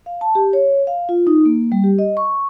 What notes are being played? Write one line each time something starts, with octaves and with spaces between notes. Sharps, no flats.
F5
A5
G4
C#5
F5
F4
D#4
A#3
G3
G4
D#5
C#6